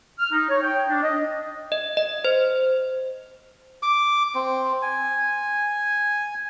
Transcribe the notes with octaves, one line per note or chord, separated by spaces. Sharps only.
F6
D#4
C#5
G5
D4
D#5
D#5
D#5
C5
D6
C4
G#5